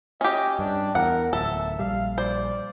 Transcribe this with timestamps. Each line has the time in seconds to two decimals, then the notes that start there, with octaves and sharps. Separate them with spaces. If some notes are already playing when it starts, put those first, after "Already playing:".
0.21 C#4 G4 D#5
0.59 G2 D4
0.95 E2 A#4 F#5
1.33 D1 A4 E5
1.79 A#1 G3 F5
2.18 C5 D5